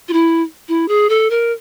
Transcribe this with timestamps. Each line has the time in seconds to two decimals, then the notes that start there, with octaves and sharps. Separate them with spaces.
0.08 F4
0.13 E4
0.68 E4
0.88 G#4
1.09 A4
1.30 A#4